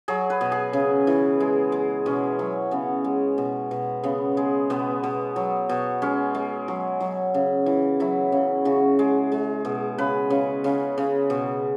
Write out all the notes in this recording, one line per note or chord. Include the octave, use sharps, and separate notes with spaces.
F#3 G#4
B4
B2
G#4
C#3
E3
G#3
G#3
B2 C#4
F#3
C#3 B3
G#3
B2
B2
C#3 B3
G#3
B2 B3
B2
F#3
B2
G#3 C#4
G#3
F#3
F#3
C#3
E3
F#3 E4
C#3
C#3 F#4
G#3
G#3
B2
C#3 B4
C#3
C#3
C#3
B2